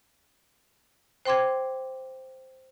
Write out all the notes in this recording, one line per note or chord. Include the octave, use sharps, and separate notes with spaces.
C5 G5 C6 D6 G#6